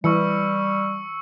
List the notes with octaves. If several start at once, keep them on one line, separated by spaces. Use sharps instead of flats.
E3 G3 C#6 E6 C#7